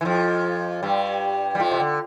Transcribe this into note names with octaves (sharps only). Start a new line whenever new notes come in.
E3
F2 F3
G2 G3
G3
F2 F3
C3
D3